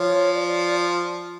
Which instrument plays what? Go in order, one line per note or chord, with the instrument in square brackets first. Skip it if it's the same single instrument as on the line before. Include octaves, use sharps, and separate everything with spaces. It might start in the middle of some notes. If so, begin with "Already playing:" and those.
Already playing: [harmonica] F3 [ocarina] C#5
[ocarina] D5